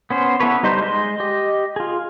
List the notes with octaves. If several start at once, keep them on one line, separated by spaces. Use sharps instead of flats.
B3 C#4 C5
B3 E4 A4 B4 C#5
G3 D#4 B4 C5
G#3 D#5 C6
G4 D#5
F4 G#4